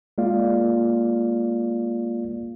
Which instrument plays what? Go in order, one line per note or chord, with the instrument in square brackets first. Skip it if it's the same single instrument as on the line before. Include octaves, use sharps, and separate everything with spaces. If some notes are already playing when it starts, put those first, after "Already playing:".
[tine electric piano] G#3 A#3 F4 D5 F5